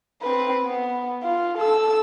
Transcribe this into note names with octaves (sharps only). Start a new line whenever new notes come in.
C4 B4
B3
F4
A4 E6